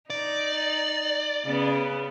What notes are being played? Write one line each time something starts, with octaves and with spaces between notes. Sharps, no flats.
D#4 D5
C#3 B3